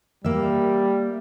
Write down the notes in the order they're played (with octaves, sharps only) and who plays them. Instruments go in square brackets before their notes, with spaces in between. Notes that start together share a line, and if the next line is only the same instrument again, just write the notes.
[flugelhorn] G3 [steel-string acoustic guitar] A#3 E5